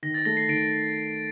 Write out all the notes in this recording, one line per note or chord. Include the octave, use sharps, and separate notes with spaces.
D#3 A#6
A6
A3 A#6
C7
D#3 A#6 D7